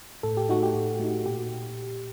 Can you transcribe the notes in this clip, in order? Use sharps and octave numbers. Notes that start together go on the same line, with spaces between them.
A2 A4
G4
A3 D#4 F#4
G4
A2
A3 D#4
A#2 G4